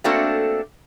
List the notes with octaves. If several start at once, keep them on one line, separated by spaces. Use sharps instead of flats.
A3 A#3 C4 D4 F#4 A4